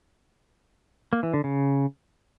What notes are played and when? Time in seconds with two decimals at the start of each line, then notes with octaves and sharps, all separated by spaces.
1.13 A#3
1.23 E3
1.34 D3
1.44 C#3